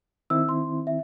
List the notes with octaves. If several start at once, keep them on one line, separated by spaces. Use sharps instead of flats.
D#3 C4 E4 E6
C6
E5